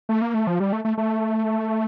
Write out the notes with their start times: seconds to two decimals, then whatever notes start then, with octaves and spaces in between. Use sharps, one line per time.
0.09 A3
0.22 A#3
0.34 A3
0.47 F3
0.60 G3
0.73 A3
0.85 A3
0.98 A3